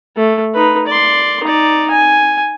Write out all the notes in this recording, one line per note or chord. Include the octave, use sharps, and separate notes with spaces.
A3
D#4 B4
D5 C6
D#4 D5
G#5